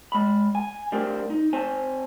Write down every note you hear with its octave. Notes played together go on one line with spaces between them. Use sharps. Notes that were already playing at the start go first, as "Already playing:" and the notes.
G#3 B5
G#5
G3 A3 C4 D4 A#4
D#4
C4 C5 G#5 A5